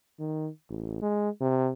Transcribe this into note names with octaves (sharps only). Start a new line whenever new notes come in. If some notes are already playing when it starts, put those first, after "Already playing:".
D#3
A1
G#3
C3